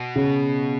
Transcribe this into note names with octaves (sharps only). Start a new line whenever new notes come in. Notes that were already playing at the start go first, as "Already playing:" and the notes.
Already playing: B2
C#3